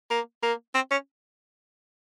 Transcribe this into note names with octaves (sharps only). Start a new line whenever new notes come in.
A#3
A#3
C4
C#4